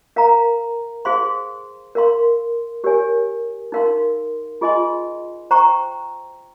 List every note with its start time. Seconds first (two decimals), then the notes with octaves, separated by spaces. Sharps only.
0.16 A#4 F5 A#5
1.05 G#4 C5 F5 C6
1.95 A#4 F5 C6
2.84 G4 A#4 C#5 G#5
3.72 D#4 A#4 F5 C6
4.61 F4 G#4 D#5 G#5 C6
5.51 C5 G5 A#5 C#6